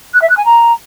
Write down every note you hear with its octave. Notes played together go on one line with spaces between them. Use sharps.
F#6
E5
F#6
G#5
A#5